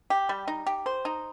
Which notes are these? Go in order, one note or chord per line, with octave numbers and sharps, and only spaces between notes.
G4
G3
D#4
G4
C5
D#4